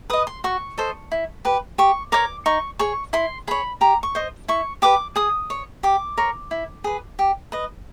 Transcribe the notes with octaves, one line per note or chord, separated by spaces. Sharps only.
B4 D#5 D#6
C6
F#4 C#6
A4 C5 D#5
E4
G4 B4
G4 C#6
A#4 C#5 D6
D#4 C#6
G#4 C#5 C#6
E4 C6
G#4 C#5 B5
G4 A#5
C#6
C5 D#5
E4 C#6
G4 B4 D6
G#4 D#6
C#5
G4 D6
A#4 C#5
E4
G#4 B4
G4
B4 D#5